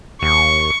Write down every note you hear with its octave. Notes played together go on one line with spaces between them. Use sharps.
D#2 C#6